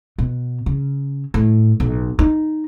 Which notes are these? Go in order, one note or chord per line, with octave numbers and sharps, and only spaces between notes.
B2
C#3
A2
B1
D#4